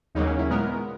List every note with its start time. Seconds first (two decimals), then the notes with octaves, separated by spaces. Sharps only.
0.15 D#2 C#3 F#3 A#3 D#4
0.26 C#4
0.38 E4
0.50 A#2 G#3 B3 A#4